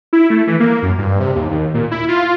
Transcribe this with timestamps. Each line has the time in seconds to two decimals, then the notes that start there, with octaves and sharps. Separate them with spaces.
0.13 E4
0.30 A3
0.47 E3
0.60 A#3
0.82 F#2
0.98 G2
1.20 C3
1.35 D#2
1.51 D#2
1.74 A#2
1.91 E4
2.08 F4